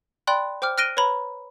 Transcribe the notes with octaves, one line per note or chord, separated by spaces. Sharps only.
D5 G5 B5 C6 F#6
C5 G5 D6 F6
F6 F#6 A#6 D7 D#7 G7
B4 C#5 A#5 B5